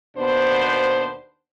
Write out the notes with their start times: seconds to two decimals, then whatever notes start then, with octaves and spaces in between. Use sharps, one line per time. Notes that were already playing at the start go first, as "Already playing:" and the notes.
0.16 D#2 B2 B3 D4 C5